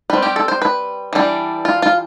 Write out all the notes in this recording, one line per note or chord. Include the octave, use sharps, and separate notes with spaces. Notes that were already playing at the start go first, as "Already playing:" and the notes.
G3 C4 B4
G4
A4
C5
B4
E3 G3 D4
F4
F4